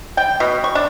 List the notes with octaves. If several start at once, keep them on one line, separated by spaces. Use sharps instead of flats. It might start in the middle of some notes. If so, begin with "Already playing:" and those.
G5
B2
C#6
D4